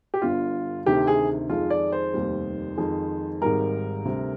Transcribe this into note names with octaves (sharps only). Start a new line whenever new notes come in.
G4
G1 G2 D3 F4
D2 C3 D#3 G4
G#4
F2 D#3 G#3 F4
D5
C5
F1 D#2 D#3 G3
F2 D#3 G#3
G#1 G#2 D#3 G3 A#4
D2 C3 G3